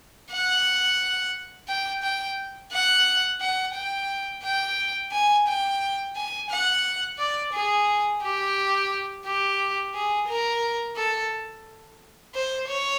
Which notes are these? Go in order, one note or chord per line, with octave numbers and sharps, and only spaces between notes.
F#5
G5
G5
F#5
F#5
G5
G5
G#5
G5
G#5
F#5
D5
G#4
G4
G4
G#4
A#4
A4
C5
C#5